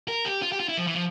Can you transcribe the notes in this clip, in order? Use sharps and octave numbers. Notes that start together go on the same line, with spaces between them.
A#4
G4
F4
G4
F4
E4
F3
E3
F3